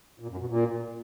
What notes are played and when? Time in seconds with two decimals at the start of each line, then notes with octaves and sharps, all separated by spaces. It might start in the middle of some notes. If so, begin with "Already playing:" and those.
0.20 A#2
0.29 F#2
0.39 B2
0.49 A#2